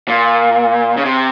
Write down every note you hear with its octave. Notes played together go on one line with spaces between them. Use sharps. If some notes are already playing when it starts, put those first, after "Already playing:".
A#2
C#3
C3